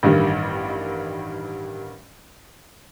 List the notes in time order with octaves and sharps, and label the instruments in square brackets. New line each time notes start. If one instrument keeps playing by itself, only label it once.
[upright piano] A1 G2 D#3 G3